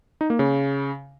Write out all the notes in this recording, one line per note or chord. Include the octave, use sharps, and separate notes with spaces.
D#4
A#3
C#3